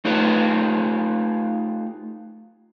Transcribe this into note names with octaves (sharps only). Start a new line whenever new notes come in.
A3 D#4 F4 G4 B4 C#5